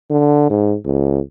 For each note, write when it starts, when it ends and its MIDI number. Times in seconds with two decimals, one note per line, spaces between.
0.10 0.49 50
0.50 0.76 44
0.85 1.20 37